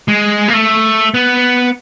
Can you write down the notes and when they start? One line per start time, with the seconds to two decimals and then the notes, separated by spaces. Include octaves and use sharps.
0.08 G#3
0.48 A#3
0.53 A3
1.14 B3